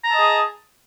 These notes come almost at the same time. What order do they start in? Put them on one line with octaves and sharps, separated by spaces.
A#5 A5 D#5 G#4